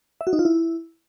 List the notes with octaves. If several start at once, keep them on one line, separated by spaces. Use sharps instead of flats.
E5
F#4
D#4
F4
E4